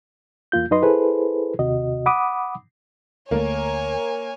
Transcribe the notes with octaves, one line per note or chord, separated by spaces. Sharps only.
E2 A#3 F4 G6
F#2 F#3 D#4 B4 D#5 C6
E4 G#4 A4 B4 C5
D#2 C3 F#4 D#5
F#5 B5 D6 D#6
D2 A3 A#3 C#5 G#5